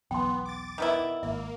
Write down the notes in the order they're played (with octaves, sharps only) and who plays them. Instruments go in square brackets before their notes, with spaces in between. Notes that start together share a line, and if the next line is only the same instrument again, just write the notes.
[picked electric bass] B1 E2 [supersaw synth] B3 [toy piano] G5 C6
[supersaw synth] D6 A6
[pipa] D#3 B3 E4
[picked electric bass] G#1 [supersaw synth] A#3 [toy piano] E5